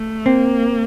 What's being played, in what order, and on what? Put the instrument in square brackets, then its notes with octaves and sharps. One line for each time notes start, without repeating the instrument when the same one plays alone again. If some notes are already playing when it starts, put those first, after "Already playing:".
Already playing: [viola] A3
[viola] A#3 [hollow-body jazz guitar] C4